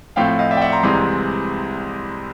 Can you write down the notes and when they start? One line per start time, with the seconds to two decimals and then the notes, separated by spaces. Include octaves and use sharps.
0.16 A2 F3 A3 C4 F5 G5
0.39 D#5 F5
0.51 D5 E5
0.57 G5
0.61 E5 F#5
0.72 A#5 C6
0.83 C2 C3 E3 G#3 C4 A#5 C6